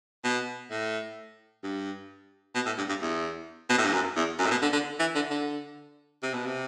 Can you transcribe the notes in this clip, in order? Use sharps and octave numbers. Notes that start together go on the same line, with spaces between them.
B2
A2
G2
B2
A2
G2
G2
E2
B2
A2
G2
F#2
E2
F#2
A2
B2
D3
D3
E3
D3
D3
C3
B2
C3